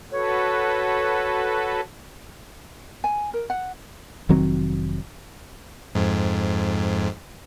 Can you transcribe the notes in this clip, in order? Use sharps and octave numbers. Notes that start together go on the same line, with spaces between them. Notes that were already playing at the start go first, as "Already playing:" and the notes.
F#4 A4 B4 C#5
G#5
A#4
F#5
F1 D#3 F#3 C4
F2 G#2